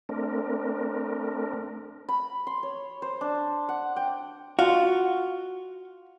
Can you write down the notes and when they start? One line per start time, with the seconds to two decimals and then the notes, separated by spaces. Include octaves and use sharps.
0.09 A3 C4 D4 A#4
2.09 B5
2.47 C6
2.63 C#5
3.02 C5
3.21 D4
3.69 F#5
3.96 G5
4.59 F4 F#4